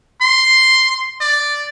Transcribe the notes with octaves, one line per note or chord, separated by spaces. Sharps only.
C6
D5